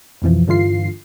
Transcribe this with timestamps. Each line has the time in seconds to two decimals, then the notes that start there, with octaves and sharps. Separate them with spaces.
0.22 B1 F2 E3 F3
0.47 G2 D3 E3 F4 C7